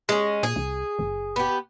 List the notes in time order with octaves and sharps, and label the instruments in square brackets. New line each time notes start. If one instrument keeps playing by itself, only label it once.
[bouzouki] G#3 C#4
[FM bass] A#2 [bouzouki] G#4
[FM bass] C2
F#1
[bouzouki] B3 G4